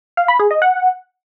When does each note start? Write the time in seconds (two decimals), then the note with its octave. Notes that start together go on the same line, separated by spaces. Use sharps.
0.17 F5
0.28 B5
0.40 G#4
0.51 D#5
0.62 F#5